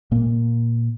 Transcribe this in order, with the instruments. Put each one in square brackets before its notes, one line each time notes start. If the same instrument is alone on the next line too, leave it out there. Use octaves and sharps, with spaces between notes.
[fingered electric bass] A#2 A#3